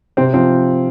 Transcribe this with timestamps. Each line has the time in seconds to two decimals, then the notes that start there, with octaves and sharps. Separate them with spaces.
0.17 C3 C4
0.34 F3 C4